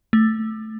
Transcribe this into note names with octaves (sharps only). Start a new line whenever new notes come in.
A3